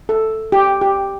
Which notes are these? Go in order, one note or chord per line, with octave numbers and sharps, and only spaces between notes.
A4
G4
G4